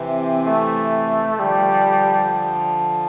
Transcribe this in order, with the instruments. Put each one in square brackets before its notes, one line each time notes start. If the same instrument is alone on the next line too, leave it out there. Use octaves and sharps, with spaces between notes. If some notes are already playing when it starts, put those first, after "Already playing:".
Already playing: [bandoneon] C3 E3 [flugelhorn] C4
[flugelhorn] A3
[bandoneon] D3 F3 [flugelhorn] G3